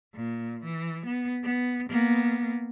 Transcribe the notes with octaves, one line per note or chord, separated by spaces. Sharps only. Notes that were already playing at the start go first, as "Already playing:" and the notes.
A#2
E3
B3
B3
A#3 B3